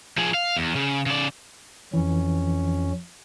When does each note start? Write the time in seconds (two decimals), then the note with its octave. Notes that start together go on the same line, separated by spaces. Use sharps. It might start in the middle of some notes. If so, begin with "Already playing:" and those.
0.18 F3 G#4
0.34 F5
0.57 E2
0.76 C#3
1.06 C#3 D5
1.94 F2 E3 C#4